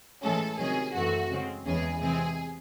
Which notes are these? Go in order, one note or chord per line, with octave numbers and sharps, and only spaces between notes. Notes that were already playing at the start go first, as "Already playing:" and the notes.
A2 E3 G#3 C#4 A4
C3 D#3 F#3 C#4 G#4
F#2 E3 A3 C4 F#4
C#3 G#3 C4
E2 C#3 E3 G#3 C#4 G#4
C3 E3 G#3 C4 G#4